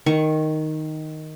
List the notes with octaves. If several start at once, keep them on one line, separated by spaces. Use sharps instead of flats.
D#3 C#6